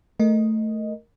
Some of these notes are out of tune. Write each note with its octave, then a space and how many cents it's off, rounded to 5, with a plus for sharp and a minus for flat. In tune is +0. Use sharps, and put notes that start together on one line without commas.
A3 +0 A#4 +0 D#5 +0